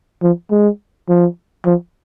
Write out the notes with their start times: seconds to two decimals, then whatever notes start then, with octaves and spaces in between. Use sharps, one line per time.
0.22 F3
0.51 G#3
1.08 F3
1.66 F3